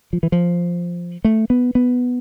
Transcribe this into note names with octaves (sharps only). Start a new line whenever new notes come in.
F3
E3
F3
A3
B3
B3